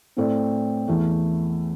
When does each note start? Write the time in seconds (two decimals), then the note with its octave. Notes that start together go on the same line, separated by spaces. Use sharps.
0.17 A2 A3 C4 A4 D5
0.88 E2 E3 A3